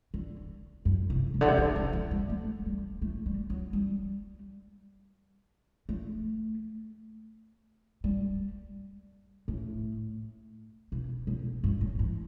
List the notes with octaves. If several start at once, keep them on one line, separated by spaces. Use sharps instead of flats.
D3
F#2
C3
C3
D3
C3
D3
D3
E3
G3
A3
G3
A3
G3
F#3
G3
A3
G3
A2
B2
B2
G2
A2
E3